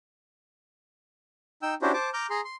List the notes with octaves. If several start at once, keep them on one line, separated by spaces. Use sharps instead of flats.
D#4 G5 E6
C#4 D4 E4 F#4 G4 C5
C5 A5 D6
A#5 D6 F6 G6
G#4 A#5 C6
C6